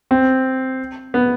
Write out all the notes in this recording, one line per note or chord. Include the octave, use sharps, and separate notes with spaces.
C4
B3